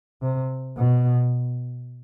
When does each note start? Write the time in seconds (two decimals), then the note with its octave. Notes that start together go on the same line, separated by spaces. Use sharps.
0.22 C3
0.77 B2